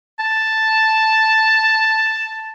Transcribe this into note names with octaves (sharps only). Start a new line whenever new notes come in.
A5